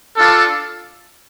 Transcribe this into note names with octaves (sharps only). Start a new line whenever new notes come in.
D4 F4 A4